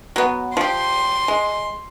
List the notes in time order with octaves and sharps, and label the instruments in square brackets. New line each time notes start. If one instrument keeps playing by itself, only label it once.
[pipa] F#3 B3
[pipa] F3 G4 [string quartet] C6
[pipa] G#3